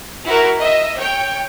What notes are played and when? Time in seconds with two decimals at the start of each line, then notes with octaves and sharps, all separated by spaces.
0.25 E4 F#4 A#4
0.59 D#5 E5
0.98 C#5 G5